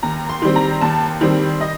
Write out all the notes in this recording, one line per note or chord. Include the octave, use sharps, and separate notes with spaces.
D#2 A#5
C6
D#3 G3 C4
A#5
D#2 A5
D#3 G3 C4
D#5